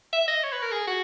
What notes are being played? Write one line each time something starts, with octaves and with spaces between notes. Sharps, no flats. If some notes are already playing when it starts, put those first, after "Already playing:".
E5
D#5
C#5
B4
A#4
G#4
F#4